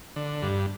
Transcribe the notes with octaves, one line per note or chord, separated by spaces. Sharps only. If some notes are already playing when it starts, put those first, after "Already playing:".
D3
G2